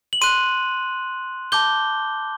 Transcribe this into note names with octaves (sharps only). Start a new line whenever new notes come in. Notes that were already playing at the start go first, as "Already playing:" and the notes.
F#7
C6 F#6 D#7
A5 D6 G6 G7